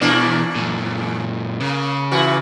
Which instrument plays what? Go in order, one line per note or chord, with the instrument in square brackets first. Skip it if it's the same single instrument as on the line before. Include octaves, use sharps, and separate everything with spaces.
[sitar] E2 A#3 D4 [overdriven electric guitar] B2 E3
[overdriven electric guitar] F#2 A#2
[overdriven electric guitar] C#3 [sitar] A#3
[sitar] A#2 E3 F#4